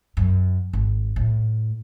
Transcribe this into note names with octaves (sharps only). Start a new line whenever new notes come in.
F#2
G#1
A2